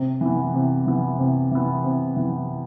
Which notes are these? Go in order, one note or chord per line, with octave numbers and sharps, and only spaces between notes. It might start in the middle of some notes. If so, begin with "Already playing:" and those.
Already playing: C3
E3 B3
C3
E3 B3
C3
E3 B3
C3
E3 B3